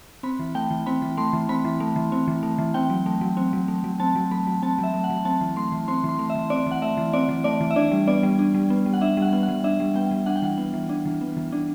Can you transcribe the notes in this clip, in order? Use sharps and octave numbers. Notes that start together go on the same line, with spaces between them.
C4 B5
E3
A3 G5
E3
C4 B5
E3
A3 C6
E3
C4 B5
E3
A3
E3
C4
E3
A3
E3
C4 G5
F#3
A3
F#3
C4
F#3
A3
F#3
C4 A5
F#3
A3 B5
F#3
C4 A5
F#3
E5
A3
F#5
F#3
C4 A5
E3
A3 C6
E3
C4 C6
E3 C6
A3
E5
E3
C4 D5
E3 F#5
A3 E5
E3
C4 D5
E3
A3 D5
E3
E5
D4 D5
G3
B3 D5
G3
D4
G3
B3
G3
F#5
D4 E5
G3 F#5
B3
F#5
G3
D4 E5
G3
B3 G5
G3
D4 F#5
G5
E3 F#5
B3
E3
D4
E3
B3
E3
D4